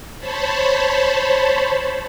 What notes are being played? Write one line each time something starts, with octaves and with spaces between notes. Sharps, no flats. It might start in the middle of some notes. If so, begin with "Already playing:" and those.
C5 C#5 A5 B5